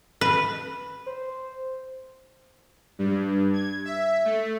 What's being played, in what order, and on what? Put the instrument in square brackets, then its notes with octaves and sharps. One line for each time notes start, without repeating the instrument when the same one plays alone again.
[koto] B4
[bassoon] C5
[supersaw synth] G2
G#6
E5
A3